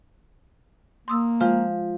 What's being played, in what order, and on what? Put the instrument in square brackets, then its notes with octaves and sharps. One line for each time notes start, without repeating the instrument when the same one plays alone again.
[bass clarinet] A#3 [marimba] C6 D#6 E6
[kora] F3 [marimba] G#3 F4